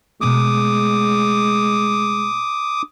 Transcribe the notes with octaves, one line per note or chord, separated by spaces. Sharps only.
B2 G#3 A3 D6 D#6